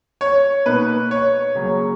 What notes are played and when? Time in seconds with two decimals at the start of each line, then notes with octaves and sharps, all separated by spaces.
0.21 C#5
0.66 B2 A#3 D#4 B4
1.11 C#5
1.55 C#3 F#3 A#3 C#4